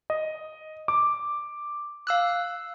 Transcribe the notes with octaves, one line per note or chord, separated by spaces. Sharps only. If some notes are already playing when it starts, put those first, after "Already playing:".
D#5
D6
F5 E6 F#6